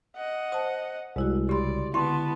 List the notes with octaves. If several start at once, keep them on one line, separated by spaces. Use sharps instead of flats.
D#5 F#5
C5 A5 D#6
C2 G#3 E4 F#4
C#3 G4 D5 B5 C6
D3 B3 E4 A5 C6 C#6